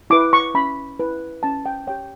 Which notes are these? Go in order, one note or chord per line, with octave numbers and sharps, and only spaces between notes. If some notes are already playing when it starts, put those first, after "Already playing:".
E4 B4 D6
C#6
C#4 B5
E4 B4
C#4 A5
G5
G4 C#5 G5